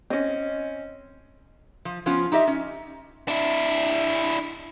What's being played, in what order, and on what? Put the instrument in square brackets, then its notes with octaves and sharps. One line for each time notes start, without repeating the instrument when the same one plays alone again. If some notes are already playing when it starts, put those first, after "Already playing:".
[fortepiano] C4 C#4 [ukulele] D#5
[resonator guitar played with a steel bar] F3
F3 B3 C#4 F4
D#4 G4 D#5 E5
C#4
[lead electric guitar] D4 E4